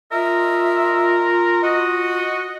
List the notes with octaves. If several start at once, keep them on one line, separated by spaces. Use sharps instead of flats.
F4 A#4 D#5 E5
F#4 D#5